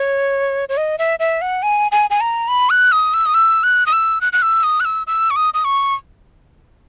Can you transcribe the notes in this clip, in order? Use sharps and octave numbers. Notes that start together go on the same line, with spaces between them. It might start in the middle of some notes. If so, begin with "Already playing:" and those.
Already playing: C#5
C#5
D#5
E5
E5
F#5
G#5
G#5
G#5
A#5
B5
F#6
D#6
E6
D#6
E6
F#6
D#6
E6
F#6
F#6
E6
D#6
F#6
E6
E6
C#6
D#6
D#6
C#6